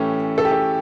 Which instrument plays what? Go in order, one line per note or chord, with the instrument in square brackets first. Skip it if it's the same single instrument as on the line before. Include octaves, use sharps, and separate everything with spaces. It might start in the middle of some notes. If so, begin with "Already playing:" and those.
Already playing: [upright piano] A2 E3 A3 C#4 G4
A4
G4
A4